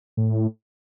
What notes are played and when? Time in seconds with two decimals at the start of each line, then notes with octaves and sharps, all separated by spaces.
0.17 A2